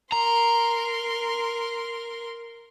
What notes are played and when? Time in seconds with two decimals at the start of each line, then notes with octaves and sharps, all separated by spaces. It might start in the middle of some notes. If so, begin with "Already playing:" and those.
0.12 A#4 A#5 C6